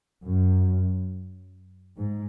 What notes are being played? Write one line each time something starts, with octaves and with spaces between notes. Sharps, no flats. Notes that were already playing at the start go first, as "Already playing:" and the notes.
F#2
G#2